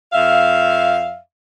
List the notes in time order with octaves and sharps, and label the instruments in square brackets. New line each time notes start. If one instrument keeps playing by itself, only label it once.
[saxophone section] F2 E5 F5